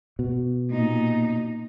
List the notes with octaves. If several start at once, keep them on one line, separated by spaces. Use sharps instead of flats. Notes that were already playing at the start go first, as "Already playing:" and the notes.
B2
A#2 D#4